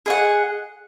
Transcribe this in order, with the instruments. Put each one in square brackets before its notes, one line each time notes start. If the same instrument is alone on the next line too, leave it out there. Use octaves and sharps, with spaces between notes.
[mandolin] G#4 D#5 F#5